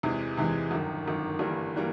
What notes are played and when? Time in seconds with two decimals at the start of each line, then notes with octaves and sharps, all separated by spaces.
0.03 E2 C3 E3 G#3
0.37 E2 C3 E3 G#3
0.71 G1 F#2 D#3
1.05 G1 F#2 D#3
1.39 G1 G2 E3 G3 A#3
1.76 E3 G3 A#3